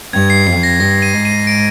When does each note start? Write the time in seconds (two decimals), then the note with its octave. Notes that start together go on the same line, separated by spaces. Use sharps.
0.13 G2 G#6
0.30 C7
0.47 F2 C7
0.63 A#6
0.80 G2 A#6
1.02 D#7
1.14 G#2
1.25 D#7
1.47 D7